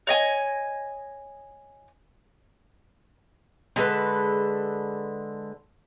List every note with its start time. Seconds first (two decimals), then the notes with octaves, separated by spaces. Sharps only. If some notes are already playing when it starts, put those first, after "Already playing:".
0.07 C#5 D#5 G#5
3.76 D3 G#3 A4 B4